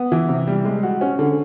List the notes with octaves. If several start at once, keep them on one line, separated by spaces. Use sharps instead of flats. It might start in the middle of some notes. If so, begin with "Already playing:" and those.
Already playing: B3
E3
C3
G3
G#3
F#4
C#4
D3